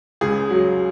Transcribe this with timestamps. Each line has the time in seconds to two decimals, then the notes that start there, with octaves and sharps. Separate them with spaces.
0.21 C#2 G#4
0.50 F#3